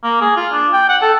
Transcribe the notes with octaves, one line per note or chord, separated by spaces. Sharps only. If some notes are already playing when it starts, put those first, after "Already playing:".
A#3
G#4
F4
D4
G5
F#5
A4